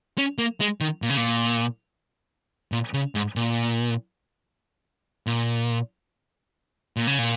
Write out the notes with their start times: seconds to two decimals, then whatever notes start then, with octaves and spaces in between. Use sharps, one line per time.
0.18 C#4
0.38 A#3
0.60 G#3
0.81 D#3
1.02 A#2
1.10 C#3
1.17 A#2
2.72 A#2
2.94 C#3
3.15 G#2
3.36 A#2
5.27 A#2
6.97 A#2
7.07 C#3
7.18 A#2